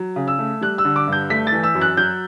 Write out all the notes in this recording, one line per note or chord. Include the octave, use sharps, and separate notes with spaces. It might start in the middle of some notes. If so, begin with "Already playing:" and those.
Already playing: F#3
C#3
E6
A3
G3 F#6
E6
D3
D6
G2 G6
A3 B6
A6
E3
E6
F#2
F#6
F#3 G6